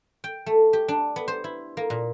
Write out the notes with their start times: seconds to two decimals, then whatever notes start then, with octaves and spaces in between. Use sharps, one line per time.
0.24 G5
0.46 A3
0.73 G4
0.88 D4
1.16 B3
1.28 C5
1.44 E4
1.77 A#3
1.90 A#2